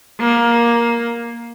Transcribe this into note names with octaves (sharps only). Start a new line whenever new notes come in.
A#3